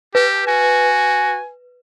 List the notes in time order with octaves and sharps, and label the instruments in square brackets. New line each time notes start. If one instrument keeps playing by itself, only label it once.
[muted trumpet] G4 [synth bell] B4
[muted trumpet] F#4 [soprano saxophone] G#5